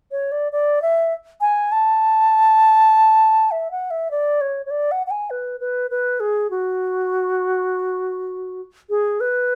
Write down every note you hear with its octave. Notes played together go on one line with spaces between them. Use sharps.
C#5
D5
D5
E5
G#5
A5
E5
F#5
E5
D5
C#5
C#5
D5
F#5
F#5
G#5
B4
B4
B4
G#4
F#4
G#4
B4